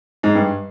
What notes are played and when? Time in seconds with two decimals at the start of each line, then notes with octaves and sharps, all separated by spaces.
0.23 G#2
0.35 G2